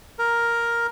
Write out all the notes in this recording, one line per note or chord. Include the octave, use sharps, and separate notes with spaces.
A#4